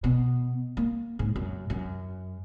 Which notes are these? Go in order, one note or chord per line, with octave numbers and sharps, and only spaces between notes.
B2
A#3
G#2 C#3
F#2
F#2